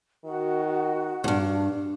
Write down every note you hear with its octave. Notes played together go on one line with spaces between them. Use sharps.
D#3 F#4
E2 G2 D4